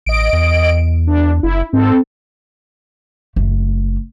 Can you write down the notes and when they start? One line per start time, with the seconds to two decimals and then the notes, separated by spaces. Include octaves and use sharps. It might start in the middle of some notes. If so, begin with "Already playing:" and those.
0.06 A1 D#5 D7
0.33 E2
1.07 D4
1.43 F#1 E4
1.73 G#2 C4 A4
3.36 F#1 A3